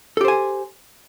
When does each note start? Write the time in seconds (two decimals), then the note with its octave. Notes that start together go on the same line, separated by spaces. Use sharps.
0.17 A4
0.21 G4
0.25 C5
0.28 G#5